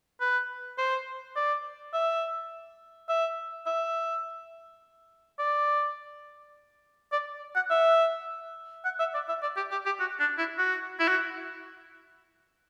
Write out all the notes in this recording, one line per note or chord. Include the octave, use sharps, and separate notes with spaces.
B4
C5
D5
E5
E5
E5
D5
D5
F#5
E5
F#5
E5
D5
E5
D5
G4
G4
G4
F#4
D4
E4
F#4
E4
F#4